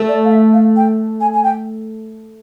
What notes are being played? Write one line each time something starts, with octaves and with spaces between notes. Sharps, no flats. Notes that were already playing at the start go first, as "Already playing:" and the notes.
Already playing: A3
D5
F5
E5
F5
G5
G#5
G#5
G5